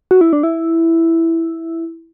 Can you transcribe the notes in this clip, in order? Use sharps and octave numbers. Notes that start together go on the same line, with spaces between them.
F#4
E4
D4
E4